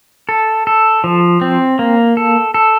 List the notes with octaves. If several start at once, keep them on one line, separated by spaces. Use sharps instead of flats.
A4
A4
F3
C4
A#3
A4
A4